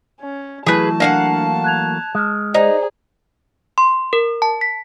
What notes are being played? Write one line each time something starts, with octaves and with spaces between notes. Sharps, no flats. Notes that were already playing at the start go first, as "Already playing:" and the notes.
C#4
E3 F#3 A3 E4 G#4 B4 A5
A#3 D4 F5 F#5
F#6 G#6 F7
G#3 D#6 F6
D#4 G#4 C5 D5 A#5
C6
A#4
A5
B6